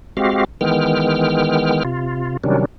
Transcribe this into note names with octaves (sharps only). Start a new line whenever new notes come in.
G#3 C4 F#4 G4 F5
D#3 E3 G#3 B3 G5 F6
C3 F4
C3 D#3 F#3 G3 C#4 D4